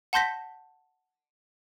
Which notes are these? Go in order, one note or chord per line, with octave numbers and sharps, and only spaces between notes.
F#5 A5 C6 G6 A#6 B6